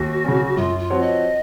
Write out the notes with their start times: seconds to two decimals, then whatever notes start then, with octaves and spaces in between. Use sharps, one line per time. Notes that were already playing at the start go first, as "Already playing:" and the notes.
Already playing: D#2 F#4
0.24 C#3 F#3 C#4
0.57 F#2 F4
0.79 F4
0.90 F3 C4 F#4 C#5
1.01 D#5